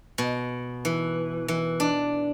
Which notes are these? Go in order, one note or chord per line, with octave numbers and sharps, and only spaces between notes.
B2
E3
E3
D4